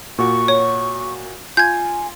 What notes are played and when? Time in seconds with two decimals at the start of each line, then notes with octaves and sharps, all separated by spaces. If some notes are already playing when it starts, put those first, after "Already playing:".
0.18 A#2 F#4 C#6
0.48 C#5
1.57 F4 G#5 G6 G#6